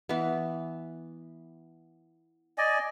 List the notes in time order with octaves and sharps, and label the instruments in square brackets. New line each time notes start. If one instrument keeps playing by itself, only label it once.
[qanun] E3 B3
[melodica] D5 D#5 G#5